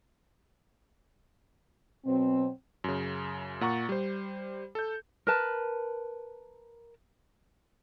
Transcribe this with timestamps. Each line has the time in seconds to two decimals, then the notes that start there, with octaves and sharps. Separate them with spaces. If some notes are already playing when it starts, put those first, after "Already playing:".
2.05 B2 F#3 C4
2.84 F#2 C#3
3.61 A#2 F#5 A#5 C#6
3.89 G3 C5
4.75 A4 G6
5.27 A#4 B4 A5